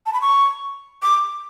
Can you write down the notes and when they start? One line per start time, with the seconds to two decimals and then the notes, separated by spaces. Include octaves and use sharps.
0.06 A5
0.13 B5
0.22 C#6
1.02 D6